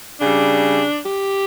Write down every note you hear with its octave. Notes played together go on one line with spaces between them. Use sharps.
C#3 G3 D4
G4